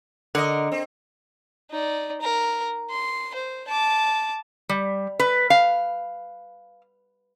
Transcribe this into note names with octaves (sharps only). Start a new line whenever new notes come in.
D3 A#4 D#5
C4
D#4 D5
A#4
C6
C5
A5 D6
G3
B4
F5